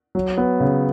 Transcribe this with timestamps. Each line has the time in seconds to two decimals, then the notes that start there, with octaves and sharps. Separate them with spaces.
0.15 F#3
0.37 B3
0.60 C#3